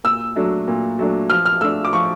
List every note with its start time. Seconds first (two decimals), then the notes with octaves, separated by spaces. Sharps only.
0.04 A#2 E6
0.36 F#3 A3 D4
0.68 A#2
0.99 F#3 A3 D4
1.30 F3 F6
1.45 F6
1.61 A3 D4 E6
1.85 D6
1.93 F3 C#6